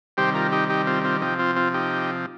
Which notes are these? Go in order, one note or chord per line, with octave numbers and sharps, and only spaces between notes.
C3 D#3 G3 G4 C5
F4 A#4
D#4 G4
D#4 G4
C4 F4
C4 F4
C3 F3 D#4 G4
C4 F4
C4 F4
D#4 G4